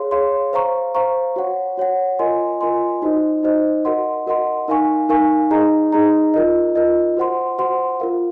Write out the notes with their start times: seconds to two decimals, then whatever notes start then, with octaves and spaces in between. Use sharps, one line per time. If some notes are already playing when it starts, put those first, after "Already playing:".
Already playing: G#4 C#5 F5 C6
0.11 G#4 C#5 F5 C6
0.53 C5 F5 A#5 C#6
0.95 C5 F5 A#5 C#6
1.36 F#4 C#5 F#5
1.77 F#4 C#5 F#5
2.19 F4 A#4 D#5 G#5 C6
2.61 F4 A#4 D#5 G#5 C6
3.02 D#4 F#4 C5 D#5
3.43 D#4 F#4 C5 D#5
3.85 F#4 A#4 D#5 F#5 C6
4.26 F#4 A#4 D#5 F#5 C6
4.68 D#4 A#4 F5 G#5 C#6
5.09 D#4 A#4 F5 G#5 C#6
5.51 D#4 G#4 D#5 A#5
5.92 D#4 G#4 D#5 A#5
6.34 F4 A#4 D#5
6.75 F4 A#4 D#5
7.17 F#4 C5 F#5 C6
7.58 F#4 C5 F#5 C6
8.00 F4 A#4 F5